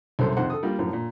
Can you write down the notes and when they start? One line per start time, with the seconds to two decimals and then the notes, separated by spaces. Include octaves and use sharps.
0.19 C2 F#2 A4 C5
0.37 F2 C3 D#3 C5 F#5
0.50 A4 D#6
0.63 G3 A#3 F4
0.79 F#2 A2 F3
0.93 A#2